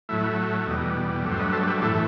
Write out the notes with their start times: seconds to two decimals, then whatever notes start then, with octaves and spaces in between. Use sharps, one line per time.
0.09 A2 F#3 A3 E4
0.67 E2 B2 G3 D#4
1.24 G2 F#3 A3
1.31 C5
1.38 B4 D#5
1.53 A4 C5
1.67 G4 B4
1.81 A2 E3 A3 A4 C5